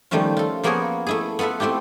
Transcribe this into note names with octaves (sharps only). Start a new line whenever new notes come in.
D#3 F3 G3 A3 C#4 F4
F4 A4
F3 A#3 B3 G#4 A#4 C#5
A3 E4 G#4
B3 F4 A4 B4 E5
A3 C4 E4 F4 G4